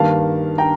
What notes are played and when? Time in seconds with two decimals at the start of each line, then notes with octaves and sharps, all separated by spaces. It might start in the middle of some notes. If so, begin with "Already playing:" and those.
Already playing: G2 D#3 A#3 F5 A5
0.58 G5 A#5